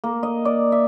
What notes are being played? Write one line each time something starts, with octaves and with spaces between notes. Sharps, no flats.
A#3
D#5
D5
E5